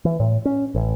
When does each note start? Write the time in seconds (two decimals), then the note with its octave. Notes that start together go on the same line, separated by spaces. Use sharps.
0.05 E3
0.20 A2
0.45 C#4
0.75 A1